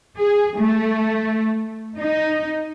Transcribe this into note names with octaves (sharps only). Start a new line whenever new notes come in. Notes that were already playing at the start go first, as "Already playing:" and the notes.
G#4
A3
D#4